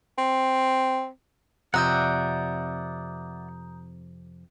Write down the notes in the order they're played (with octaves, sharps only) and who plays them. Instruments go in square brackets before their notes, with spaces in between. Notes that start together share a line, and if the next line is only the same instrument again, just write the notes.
[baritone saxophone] C4
[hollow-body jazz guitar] F2 C3 [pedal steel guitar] D5 E5 F#5 [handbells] A#5 D#6 G6